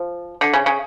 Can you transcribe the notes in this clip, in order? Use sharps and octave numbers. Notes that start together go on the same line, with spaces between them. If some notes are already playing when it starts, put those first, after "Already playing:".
Already playing: F3
D3
C#3
C#3